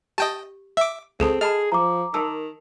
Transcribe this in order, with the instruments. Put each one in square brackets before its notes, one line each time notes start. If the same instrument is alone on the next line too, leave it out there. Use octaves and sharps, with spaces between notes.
[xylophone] G4 [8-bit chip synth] D#5 G5 A5
[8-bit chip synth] E5 D6
[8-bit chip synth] C#2 [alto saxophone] C4 [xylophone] G#4 A4 A5
[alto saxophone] G#4 [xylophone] D#5 A5 B5 [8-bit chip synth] F6
[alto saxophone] F3 [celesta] A#5 D6
[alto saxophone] D#3 [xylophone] A#4 A5 E6